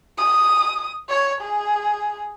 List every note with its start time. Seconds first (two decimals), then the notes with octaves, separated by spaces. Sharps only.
0.18 D#6
1.09 C#5
1.41 G#4